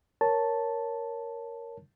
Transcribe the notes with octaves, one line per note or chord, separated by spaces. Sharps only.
A#4 C#5 A5